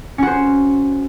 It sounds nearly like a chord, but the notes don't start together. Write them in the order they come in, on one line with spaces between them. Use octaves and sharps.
C#4 F#4 C5